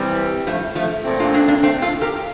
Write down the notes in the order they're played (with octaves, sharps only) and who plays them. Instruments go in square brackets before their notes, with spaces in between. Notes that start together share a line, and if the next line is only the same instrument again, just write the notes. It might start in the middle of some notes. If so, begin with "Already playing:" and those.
Already playing: [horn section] C3 E3 G3
[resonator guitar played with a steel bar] F3 A3
F3 A3
[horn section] A#2 A3 C4
[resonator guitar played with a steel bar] D4 F4
A#3 D4
A#3 D4
A3 C4
F4 A4
G4 A#4